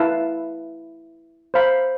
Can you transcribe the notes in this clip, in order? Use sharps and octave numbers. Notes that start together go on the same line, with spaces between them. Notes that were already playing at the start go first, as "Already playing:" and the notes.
Already playing: E4 B4 F5 A5
C5 F5 B5